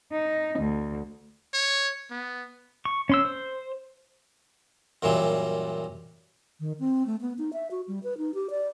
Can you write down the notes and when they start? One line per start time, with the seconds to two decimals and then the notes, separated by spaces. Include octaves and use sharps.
0.12 D#4
0.59 D2
1.54 C#5
2.11 B3
2.85 C#6
3.09 C#4 C6 E6
3.25 C5
5.03 F#2 A#2 E3 F#3 G3
6.59 D#3
6.80 C4
7.06 A3
7.21 B3
7.38 D#4
7.53 E5
7.71 F#4
7.88 G3
8.03 B4
8.18 D#4
8.34 G4
8.50 D5